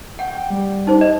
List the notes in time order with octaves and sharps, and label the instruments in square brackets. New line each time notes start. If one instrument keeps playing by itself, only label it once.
[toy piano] F#5 [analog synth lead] G5
[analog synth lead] G3
[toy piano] D#4 C5
[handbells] D#5